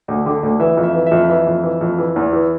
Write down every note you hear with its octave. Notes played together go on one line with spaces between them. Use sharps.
D2
D3
D2
E3 E5
F2
E5
E3
F2 E5
E3 E5
F2
E3
F2
E3
E2
E3